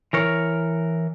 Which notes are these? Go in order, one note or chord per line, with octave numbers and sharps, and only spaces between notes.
E3 A#4 C#5